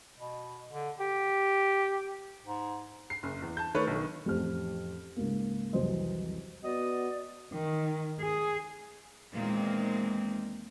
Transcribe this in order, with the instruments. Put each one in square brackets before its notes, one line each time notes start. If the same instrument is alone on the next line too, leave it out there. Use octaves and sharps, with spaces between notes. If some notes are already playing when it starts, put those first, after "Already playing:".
[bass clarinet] B2
D3
G4
G#2
[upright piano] C7
F#1
E2
A5 G6
D#3 A3 B4 C#5
B1 D#3
[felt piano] A1 F2 G4 C5 F6
C#2 G#2 A#3
C2 F2 E3 F#3 C5 D#5
[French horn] B3 [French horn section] F#4 [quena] D5 [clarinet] D#5
[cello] D#3
G#4
[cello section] E2 A#2 D#3 G#3 A#3 C4